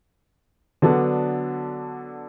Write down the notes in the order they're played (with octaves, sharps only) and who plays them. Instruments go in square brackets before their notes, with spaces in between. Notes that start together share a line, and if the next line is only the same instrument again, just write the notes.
[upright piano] D3 F#3 B3 D4 A4